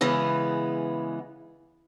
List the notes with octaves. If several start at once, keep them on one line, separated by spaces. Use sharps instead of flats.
C#3 E3 G#3 B3